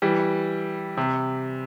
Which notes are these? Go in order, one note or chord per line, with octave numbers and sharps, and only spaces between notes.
E3 G3
C3